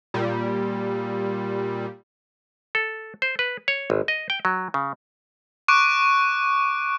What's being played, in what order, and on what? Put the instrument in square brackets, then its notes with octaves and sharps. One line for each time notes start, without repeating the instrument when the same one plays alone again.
[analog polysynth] A#2 G3
[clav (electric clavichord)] A4
C5
B4
C#5
G#1
D#5
G5
F#3
C#3
[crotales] C#6 D6 F#6 D7